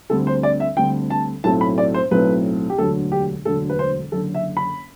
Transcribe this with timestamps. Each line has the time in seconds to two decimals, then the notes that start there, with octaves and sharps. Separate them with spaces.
0.10 D2 D3 G3 C4 A4
0.27 C5
0.43 D5
0.60 E5
0.77 D2 D3 G3 C4 G5
1.10 A5
1.44 B1 A2 F#3 A3 C4 A5
1.61 B5
1.78 D5
1.94 C5
2.11 B1 A2 F#3 A3 C4 B4
2.70 G4
2.78 E1 D2 D3 F#3 A4
3.12 G4
3.45 E1 D2 D3 F#3 A4
3.70 B4
3.79 C5
4.12 F#1 F#2 D3 A4
4.34 E5
4.57 B5